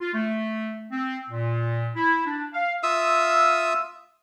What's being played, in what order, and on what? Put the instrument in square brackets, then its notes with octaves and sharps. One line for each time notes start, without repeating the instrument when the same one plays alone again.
[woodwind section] F4
A3
C4
A#2
E4
D4
F5
[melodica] F4 E5 D#6 E6